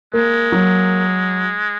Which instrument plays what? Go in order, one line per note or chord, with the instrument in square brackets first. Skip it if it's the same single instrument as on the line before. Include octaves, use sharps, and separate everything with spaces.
[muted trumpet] G#3 [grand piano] A#3
[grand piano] F#3